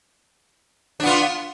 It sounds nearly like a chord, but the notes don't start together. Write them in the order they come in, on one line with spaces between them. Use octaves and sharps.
D4 B3 F4